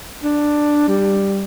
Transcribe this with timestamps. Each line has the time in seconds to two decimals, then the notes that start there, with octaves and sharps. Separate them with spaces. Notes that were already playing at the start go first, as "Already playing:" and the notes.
0.24 D4
0.88 G3